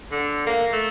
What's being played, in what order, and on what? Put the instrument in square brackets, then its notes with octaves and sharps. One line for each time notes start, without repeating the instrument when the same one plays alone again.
[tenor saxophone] D3
A#3
A3